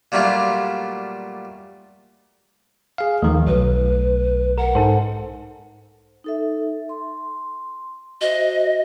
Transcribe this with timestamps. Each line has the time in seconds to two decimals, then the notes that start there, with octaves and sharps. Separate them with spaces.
0.12 A#2 F#3 G3 A3 D4 F4
2.98 G#4 F5
3.22 D#2 D#3 F3 A3
3.47 B1 B4
4.58 A#4 F#5
4.75 G#2 D#4 A4 C5
6.24 D#4 A4 E5
6.89 C6
8.21 F#4 C5 D#5 E5